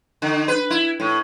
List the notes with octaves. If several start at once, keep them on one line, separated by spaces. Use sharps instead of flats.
D3
B4
E4
A2